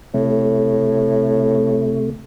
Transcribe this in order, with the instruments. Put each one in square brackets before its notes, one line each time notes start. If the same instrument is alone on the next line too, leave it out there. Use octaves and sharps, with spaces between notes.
[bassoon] A2 [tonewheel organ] C3 A3